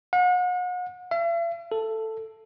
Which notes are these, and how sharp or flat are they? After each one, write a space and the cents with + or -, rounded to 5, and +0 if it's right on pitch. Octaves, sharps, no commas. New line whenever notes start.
F#5 -40
E5 +45
A4 +5